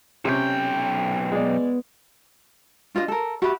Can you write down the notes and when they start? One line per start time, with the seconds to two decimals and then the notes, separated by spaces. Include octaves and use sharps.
0.25 B1 C3 C#4 G5
1.32 G#3 B3 D5
2.95 D4 F4 B4 D#5
3.08 A4 A#4
3.42 F#4 G4 E5 B5